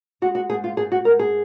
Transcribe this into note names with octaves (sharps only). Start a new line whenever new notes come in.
G#3 F#4
F#4
G#2 G#4
F4
G#2 G#4
F#4
G#2 A#4
G#4